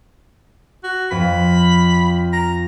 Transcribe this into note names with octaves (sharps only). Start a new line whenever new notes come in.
F#4
F2 B5
A#5